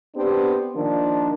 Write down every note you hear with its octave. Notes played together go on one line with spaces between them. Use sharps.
B3 C4 D4 G4
D#3 F3 A#3 D4